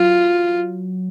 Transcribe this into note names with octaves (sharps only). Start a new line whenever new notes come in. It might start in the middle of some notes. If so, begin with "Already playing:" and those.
Already playing: F#3 F4